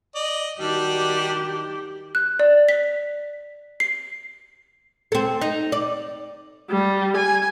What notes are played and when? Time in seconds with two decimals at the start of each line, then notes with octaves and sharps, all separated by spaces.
0.15 D5 D#5
0.60 D#3 G3 D4 F#4 G4
2.15 F#6
2.40 D5
2.69 B6
3.80 C7
5.12 C4 A4
5.41 D#4
5.72 D5
6.70 G3
7.17 G#5